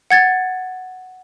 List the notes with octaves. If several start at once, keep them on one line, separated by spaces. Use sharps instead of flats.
F#5 G#6 A6